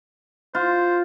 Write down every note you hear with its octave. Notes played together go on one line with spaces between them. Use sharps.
F4 C5